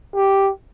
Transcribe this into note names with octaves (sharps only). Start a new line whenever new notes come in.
G4